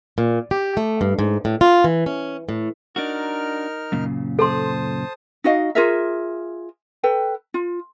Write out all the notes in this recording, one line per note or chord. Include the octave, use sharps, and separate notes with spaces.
A#2
G4
A3
G2
G#2
A2
F4
E3
C#4
A2
D4 D#4 F#4 A#4 F6
F#2 A#2 C#3
A4 C5 A5 C6 D#6
D#4 F#4 D#5 F5
F4 G#4 A#4 E5
A4 B4 G5
F4